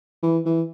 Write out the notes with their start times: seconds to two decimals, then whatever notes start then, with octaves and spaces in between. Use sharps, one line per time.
0.23 E3
0.46 E3